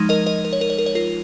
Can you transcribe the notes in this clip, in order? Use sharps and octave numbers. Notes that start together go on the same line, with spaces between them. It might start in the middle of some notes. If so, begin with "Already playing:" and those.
Already playing: F3 G#3 D#4
A#4 D#5
A#4 D#5
A#4
C#5
A#4
C#5
A#4
C#5
F4 A#4